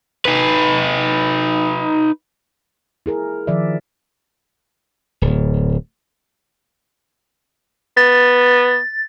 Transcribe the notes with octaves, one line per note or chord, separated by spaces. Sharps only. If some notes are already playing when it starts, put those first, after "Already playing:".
D#4 B4
E4 G#4 A#4
D#3 F3 D5 E5
D1
B3 A6